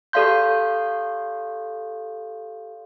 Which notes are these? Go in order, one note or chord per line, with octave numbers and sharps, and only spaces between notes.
G4 A4 D5 F5 C6 G6